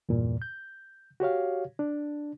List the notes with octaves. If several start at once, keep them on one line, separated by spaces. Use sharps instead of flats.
E2 G2 A#2
G6
F#4 G4 C#5 F5
D4